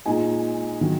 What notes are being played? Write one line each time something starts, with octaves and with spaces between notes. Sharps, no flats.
A#2 G#3 D#4 G#5
D#3 F#3